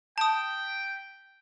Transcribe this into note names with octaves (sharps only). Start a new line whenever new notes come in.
G5 A5 D#6